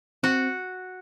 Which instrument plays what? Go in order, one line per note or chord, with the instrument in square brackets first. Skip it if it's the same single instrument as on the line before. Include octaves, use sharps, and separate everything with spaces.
[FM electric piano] C4 [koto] F#4